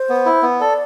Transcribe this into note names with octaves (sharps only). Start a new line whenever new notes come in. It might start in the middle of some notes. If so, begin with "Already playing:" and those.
Already playing: C5
B3
E4
B3
A4 D5